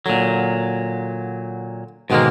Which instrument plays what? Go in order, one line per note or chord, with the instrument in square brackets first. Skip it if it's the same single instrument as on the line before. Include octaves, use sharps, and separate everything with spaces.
[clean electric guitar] A#2 F#3 [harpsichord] D3
[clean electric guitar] G#2 G#3 A#3 [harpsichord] B2 D3 D#3